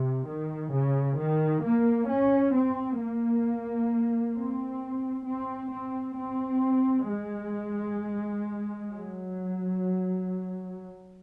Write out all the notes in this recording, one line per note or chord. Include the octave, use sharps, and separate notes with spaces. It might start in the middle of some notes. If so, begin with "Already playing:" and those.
Already playing: C3
D#3
C#3
D#3
A#3
C#4
C4
A#3
C4
C4
C4
C4
G#3
F#3